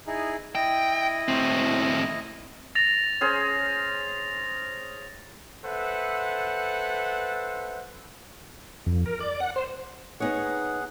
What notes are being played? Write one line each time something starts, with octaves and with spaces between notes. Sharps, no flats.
D#4 E4 G#4
E4 D#5 G5
A2 C4
A6 A#6 F7
C#4 G#4 C5
A4 B4 C5 E5 F#5
F2
A#4
D5
F#5
C5
B3 D#4 G#4 C#5 F#5